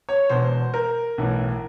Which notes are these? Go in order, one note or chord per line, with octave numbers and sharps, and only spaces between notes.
C#5
E1 E2 B2 C5
A#4
B1 A2 E3